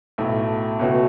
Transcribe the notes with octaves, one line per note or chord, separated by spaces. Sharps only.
B1 A2 A3
C#2 B2 A3 C#4 F#4